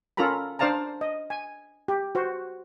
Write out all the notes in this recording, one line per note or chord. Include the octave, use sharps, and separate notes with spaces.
C#4 F4 A4 A#4 A#5 B5
D4 C5 D5 F5 A5 A#5
D#5
G#5
G4
F#4 C5